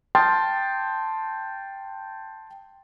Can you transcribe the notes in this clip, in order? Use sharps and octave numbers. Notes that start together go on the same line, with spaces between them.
G5 A5 C6 D#6 F6 A6